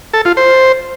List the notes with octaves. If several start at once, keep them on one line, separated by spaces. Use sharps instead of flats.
A4
F4
C5